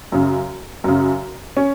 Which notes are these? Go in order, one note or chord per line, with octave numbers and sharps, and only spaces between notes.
F#2 C#3
F#2 C#3
C#4